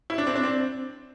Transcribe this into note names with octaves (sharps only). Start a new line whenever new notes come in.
E4
D4
C4
D4
C4